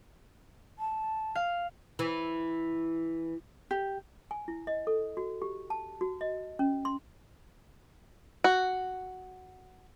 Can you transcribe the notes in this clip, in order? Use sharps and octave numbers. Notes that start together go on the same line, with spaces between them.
A5
F5
E3
G4
G#5
E4
D#5
A4
F#4
G4
A5
F#4
D#5
C#4
C6
F#4